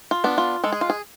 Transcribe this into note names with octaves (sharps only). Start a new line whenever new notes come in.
F4
B3 D4
F4
G#3 A4
G#4
F4
G#4